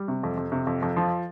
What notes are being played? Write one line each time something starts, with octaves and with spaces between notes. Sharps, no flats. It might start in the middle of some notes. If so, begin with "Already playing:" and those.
Already playing: G3
C3
F2
F2
C3
F2
F2
F3